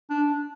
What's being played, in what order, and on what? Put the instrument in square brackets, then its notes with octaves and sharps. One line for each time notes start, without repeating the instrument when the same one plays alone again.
[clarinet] D4